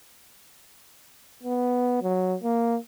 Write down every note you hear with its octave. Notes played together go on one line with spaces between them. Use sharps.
B3
F#3
A#3